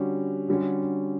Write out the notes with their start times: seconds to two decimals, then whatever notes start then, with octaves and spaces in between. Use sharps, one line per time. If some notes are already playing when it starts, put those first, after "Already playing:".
Already playing: D3 G3 C#4 F#4
0.49 D3 G3 C#4 F#4